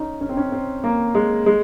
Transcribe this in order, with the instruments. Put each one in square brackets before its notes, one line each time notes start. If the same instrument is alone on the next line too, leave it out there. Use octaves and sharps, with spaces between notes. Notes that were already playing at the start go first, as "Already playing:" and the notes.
Already playing: [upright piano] C#4 D#4
C#4
C4
C#4
C4
A#3
G#3
G#3